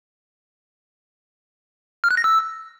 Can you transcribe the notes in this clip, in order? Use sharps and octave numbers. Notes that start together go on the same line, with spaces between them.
F6
F#6
A#6
E6